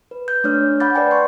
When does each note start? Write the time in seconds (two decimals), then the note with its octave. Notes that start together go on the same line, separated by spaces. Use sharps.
0.11 B4
0.28 G6
0.44 A3 D4 C#5 F6
0.80 F#5 B5 D6 G6 A6
0.95 B4 D5 G5 G#5
1.11 C6 C#6